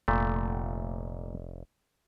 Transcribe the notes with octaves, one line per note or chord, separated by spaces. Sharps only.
F1 A#2 A3